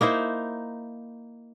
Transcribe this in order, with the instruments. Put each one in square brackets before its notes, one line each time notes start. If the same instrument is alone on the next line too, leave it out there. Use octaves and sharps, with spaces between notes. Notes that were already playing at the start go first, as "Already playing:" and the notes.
[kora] A#3 D#4 E4 C5